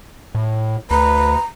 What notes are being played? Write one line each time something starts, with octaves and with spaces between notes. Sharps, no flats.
A2
D2 B4 A#5